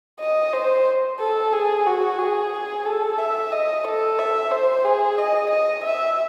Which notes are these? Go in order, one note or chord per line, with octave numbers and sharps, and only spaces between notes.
D#5
C5
A4
G#4
F#4
G#4
A4
E5
D#5
A4
E5
C5
G#4
D#5
D#5
E5